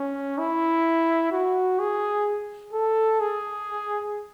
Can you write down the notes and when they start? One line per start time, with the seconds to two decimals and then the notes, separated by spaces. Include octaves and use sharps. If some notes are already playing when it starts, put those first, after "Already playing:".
Already playing: C#4
0.38 E4
1.32 F#4
1.79 G#4
2.73 A4
3.20 G#4